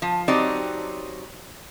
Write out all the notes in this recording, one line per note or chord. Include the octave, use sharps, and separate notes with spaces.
F3
F#3 C4 D#4 G4 D5